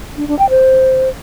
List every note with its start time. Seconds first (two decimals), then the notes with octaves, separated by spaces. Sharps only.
0.17 D4
0.28 D4
0.39 G5
0.50 C5